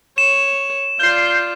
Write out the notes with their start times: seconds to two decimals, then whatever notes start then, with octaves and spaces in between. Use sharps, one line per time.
0.18 C#5 E7
0.99 F4 D5 G6 C7